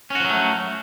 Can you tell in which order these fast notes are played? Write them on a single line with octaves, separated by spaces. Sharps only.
C#4 F#4 F3 F#3 A3